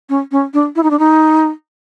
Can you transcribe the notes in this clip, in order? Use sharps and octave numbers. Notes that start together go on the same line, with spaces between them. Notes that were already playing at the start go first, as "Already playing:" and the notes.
C#4
C#4
D4
E4
D#4
D4
D#4